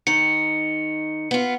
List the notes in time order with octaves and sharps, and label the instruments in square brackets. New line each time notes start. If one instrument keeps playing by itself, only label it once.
[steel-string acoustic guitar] D#3 D#4 [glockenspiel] C#7
[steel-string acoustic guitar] B3 F4